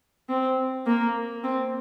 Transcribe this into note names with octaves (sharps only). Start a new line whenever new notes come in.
C4
A#3
C4